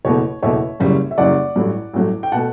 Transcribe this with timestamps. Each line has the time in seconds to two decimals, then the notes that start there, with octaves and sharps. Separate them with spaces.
0.05 F#1 E2 B2 A3 C#5
0.42 F#1 E2 B2 A3 C#5 E5
0.80 F#1 F#2 C#3 G3
1.11 E5
1.18 F#1 F#2 C#3 G3 D5 F#5
1.56 A1 G2 F#3 A3
1.93 A1 G2 F#3 A3
2.23 G5
2.32 B2 A3 F#5 A5